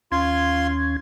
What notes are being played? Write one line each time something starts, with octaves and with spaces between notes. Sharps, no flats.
D#2 C#4 F4 C6 G#6